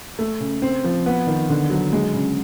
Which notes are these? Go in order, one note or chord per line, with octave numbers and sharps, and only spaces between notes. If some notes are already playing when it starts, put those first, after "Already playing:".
A3
C#3
C4
F3
B3
D#3
D3
F#3
G#3
C#3